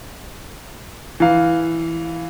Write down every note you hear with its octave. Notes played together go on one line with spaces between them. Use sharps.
E3 F5